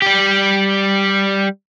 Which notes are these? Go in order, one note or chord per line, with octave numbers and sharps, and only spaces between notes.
G3 G4